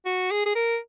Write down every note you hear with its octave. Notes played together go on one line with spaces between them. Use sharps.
F#4
G#4
G#4
A#4